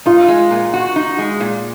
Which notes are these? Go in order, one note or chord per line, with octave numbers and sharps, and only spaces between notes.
D#4 F4
G#3
A#2
F#4
D#4
G#3
A#2